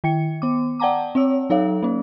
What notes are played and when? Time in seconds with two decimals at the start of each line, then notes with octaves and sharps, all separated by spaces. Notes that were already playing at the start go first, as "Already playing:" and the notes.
0.04 D#3 G5 C#7
0.42 B3 D6
0.80 D5 F#5 G5 A5 A#5 D6
1.15 C4 C#5 E6
1.50 F#3 D#4 A4 C#5 F5
1.83 A#3 C#4